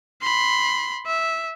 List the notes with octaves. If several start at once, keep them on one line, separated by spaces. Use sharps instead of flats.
B5 C6
E5